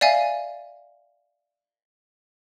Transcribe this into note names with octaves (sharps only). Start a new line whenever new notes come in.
D5 E5 F5 G#5